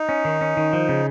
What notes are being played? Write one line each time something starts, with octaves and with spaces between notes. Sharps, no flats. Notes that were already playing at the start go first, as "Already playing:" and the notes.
Already playing: D#4
C#4
D#3
C#4
D#3
F3
C#3